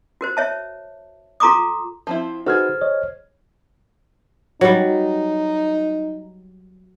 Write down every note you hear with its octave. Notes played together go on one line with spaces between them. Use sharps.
F#4 A#4 C5
C#5 E5 A5
F4 A4 A#5 C6 D6 D#6
F3 C4 E4
D#4 F#4 G#4 A4 B4 C5 F6 G#6
C#5 D#5
F#3 G3 D#4